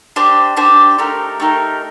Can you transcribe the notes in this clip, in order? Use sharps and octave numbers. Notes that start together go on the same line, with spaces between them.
D4 G4 C5
D4 G4 C5
A3 D#4 G4 A#4
A3 D#4 G4 A#4